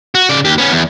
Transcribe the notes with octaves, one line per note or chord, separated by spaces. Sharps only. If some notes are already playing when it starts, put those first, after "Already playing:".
F#4
C#3 D5
D#2 G4
B3 C#4
E2